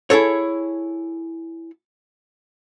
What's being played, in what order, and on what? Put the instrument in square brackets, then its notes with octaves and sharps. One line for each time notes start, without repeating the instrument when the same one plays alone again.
[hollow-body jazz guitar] E4 G#4 A4 C#5